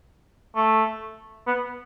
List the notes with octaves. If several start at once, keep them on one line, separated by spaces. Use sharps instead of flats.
A3
B3